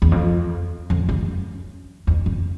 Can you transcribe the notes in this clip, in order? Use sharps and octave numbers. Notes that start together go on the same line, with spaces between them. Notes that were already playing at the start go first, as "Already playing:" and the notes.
E2
F2
F2
F#2
F2
F#2